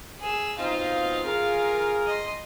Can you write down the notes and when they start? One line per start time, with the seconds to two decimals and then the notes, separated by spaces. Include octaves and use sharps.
0.20 G#4 E6
0.58 B2 C4 D#4 F4 F5
1.23 G#4 A#4
2.06 D#5 C6